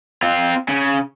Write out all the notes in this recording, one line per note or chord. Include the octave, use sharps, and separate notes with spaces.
C4 F4
C#3